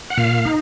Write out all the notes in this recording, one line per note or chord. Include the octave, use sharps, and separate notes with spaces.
F#5
A#2 F5
D#4